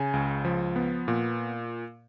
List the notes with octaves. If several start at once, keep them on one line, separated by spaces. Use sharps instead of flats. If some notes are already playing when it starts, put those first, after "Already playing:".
Already playing: C#3 G#5
C#2
F3
B3
A#2